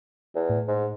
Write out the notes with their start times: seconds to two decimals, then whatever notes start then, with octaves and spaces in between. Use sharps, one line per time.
0.35 E2
0.50 A2
0.68 G#2